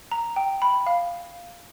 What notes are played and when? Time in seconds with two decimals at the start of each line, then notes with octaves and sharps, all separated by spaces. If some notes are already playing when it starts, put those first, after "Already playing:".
0.11 A#5
0.36 G5
0.62 B5
0.87 F5